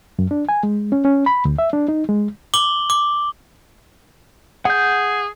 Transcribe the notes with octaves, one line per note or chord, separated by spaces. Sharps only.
F#2
D4
G#5
G#3
C#4
C#4
B5
D2
E5
D4
D#4
G#3
D6 F#7 G7
D6
G#4 F#5 G6